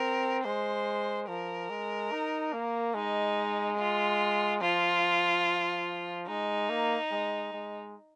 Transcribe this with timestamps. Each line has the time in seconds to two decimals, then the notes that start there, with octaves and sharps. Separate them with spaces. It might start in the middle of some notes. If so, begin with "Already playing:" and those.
Already playing: C4 A#4
0.44 G#3 C5
1.28 F3 A#4
1.69 G#3
2.11 D#4
2.53 A#3
2.94 G#3 D#4
3.78 F4
4.61 F3 F4
6.28 G#3 D#4
6.70 A#3
7.11 G#3
7.53 G#3